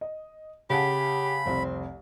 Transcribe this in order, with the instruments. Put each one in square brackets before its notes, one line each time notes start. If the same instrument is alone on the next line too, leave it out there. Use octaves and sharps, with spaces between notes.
[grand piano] D#5
[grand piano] C#3 F#5 A5 [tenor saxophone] G4 [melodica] B5
[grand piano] F1 C2 [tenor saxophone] C4